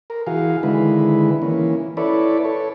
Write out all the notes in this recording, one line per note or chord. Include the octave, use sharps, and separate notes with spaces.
A#4
E3 F#4 G#4 F5
D3 D#3 G#3 E4 B4
E3 A#3 C#4
E4 A4 B4 C#5 D5
A4 C#5